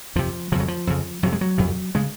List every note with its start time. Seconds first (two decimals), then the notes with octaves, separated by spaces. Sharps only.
0.16 F2 C3 F3
0.52 C#3 F3
0.55 F2 F#3
0.68 F3
0.87 F2 C#3
1.23 F2 C3 F#3
1.32 G#3
1.41 F#3
1.58 F2 C3
1.95 C#3 G#3